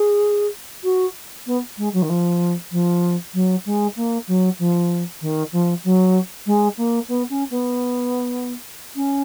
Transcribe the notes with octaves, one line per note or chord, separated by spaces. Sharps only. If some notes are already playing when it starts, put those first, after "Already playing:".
Already playing: G#4
F#4
B3
G#3
F#3
D#3
F3
F3
F#3
G#3
A#3
F#3
F3
D#3
F3
F#3
G#3
A#3
B3
C#4
B3
C#4